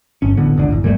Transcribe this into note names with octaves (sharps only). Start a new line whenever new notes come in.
G1 C#4
D1 A1 D3 B3
F#1 C#2 D3
G#1 E2
G#1 A#2 G3 A3